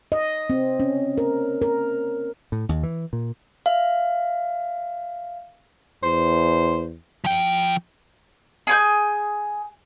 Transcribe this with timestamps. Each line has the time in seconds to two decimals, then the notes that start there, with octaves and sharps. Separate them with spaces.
0.12 D#5
0.50 C4
0.80 C#4
1.18 A#4
1.62 A#4
2.52 A2
2.69 D#2
2.83 E3
3.13 A#2
3.66 E5 F5
6.03 E2 C5
7.24 F3 G5
8.67 G#4 G#5 G6